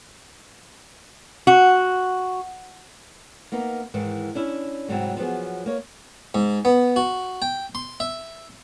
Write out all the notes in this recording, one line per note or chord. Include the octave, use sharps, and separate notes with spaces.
F#4
A#3 B3 D#4
G#2 D#3 E3
C#4 D4 E4
G#2 C3 F#3 G3 C4 E4
F3 F#3 B3 G#4
A#3 C#5
G#2
B3
F#4
G5
C6
E5